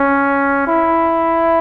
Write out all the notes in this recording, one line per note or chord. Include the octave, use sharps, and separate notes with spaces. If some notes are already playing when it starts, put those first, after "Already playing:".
Already playing: C#4
E4